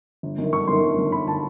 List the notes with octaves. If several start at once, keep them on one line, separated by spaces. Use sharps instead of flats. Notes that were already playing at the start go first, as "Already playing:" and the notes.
G1
F#2 D#3
G1 C#6
F#2 D#3 C6
G1
F#2 D#3
G1 B5
D#3 A5